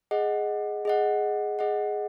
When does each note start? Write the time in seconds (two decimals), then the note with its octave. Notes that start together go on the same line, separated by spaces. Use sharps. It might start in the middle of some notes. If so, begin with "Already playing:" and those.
0.11 G#4 D#5 F#5
0.85 G#4 D#5 F#5
1.59 G#4 D#5 F#5